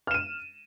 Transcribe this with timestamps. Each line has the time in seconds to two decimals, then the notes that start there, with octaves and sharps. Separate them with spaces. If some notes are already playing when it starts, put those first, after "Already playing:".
0.07 F6
0.11 E7
0.14 D#7